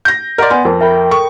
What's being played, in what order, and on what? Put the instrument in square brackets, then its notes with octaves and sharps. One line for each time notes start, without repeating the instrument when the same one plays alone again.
[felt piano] G6 A#6
[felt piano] A#4 D5 [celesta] D#5 F#5 C6
[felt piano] B3 [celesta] D5 G#5 C6
[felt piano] F2 [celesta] A#4 C5 A5
[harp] A#4 G5 B5 [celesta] E5
[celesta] A4 [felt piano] C#6